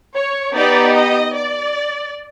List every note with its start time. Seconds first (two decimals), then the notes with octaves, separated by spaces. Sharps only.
0.15 C#5
0.54 B3 D#4 G4 D5
0.95 D#5
1.36 D5